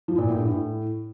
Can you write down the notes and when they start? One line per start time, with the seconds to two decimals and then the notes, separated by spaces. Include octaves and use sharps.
0.08 F3
0.18 A#2
0.28 A2
0.38 G2
0.47 A2